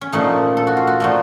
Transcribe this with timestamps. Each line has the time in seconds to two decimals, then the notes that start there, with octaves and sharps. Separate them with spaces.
0.01 C#4
0.12 A#2 F3 A3 D#4
0.57 A4
0.67 F#4
0.77 F4
0.87 F#4
1.00 A#2 F3 A3 A#4